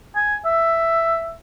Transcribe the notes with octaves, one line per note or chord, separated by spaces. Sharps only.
G#5
E5